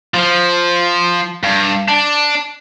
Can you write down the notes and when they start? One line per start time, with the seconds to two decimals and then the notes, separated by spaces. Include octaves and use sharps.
0.14 F3
1.43 G2
1.88 D4